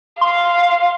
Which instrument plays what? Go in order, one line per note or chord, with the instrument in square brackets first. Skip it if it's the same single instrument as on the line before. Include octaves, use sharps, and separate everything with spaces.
[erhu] F5 [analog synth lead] C6